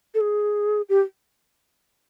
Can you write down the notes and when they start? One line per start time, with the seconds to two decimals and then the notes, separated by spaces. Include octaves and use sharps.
0.14 A4
0.21 G#4
0.89 G4